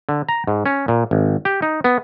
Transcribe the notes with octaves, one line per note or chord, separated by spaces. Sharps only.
D3
A#5
G#2
C#4
A#2
G#1
G4
D#4
B3